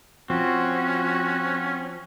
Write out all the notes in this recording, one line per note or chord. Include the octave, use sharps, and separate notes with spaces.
F3 C4 C#4 F#4